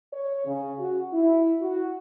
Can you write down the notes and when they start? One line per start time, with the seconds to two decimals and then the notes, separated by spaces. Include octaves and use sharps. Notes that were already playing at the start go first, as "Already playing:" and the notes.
0.12 C#5
0.46 C#3
0.79 F#4
1.13 E4
1.61 F#4